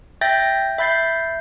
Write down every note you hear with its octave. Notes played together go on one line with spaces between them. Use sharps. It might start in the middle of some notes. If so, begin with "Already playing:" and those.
E5 G5 G6 A6 A#6
E5 B5 G6 A6 C7